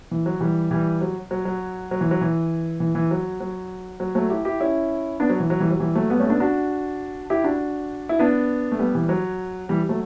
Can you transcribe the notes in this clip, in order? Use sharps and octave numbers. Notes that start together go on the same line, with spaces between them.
E3
F#3
E3 G3
E3 G3
F#3
F#3
F#3
F#3
E3
F#3
E3
E3
E3
F#3
F#3
F#3
F#3 A3
E4 G4
E4 G4
C#4 E4
B3 D4
F#3
E3
F#3
E3 G3
F#3
E3 G3
F#3 A3
G3 B3
A3 C#4
B3 D4
D4 F#4
E4 G4
D4 F#4
E4
B3 D4
A3
G3 B3
E3 G3
F#3
E3 G3
F#3 A3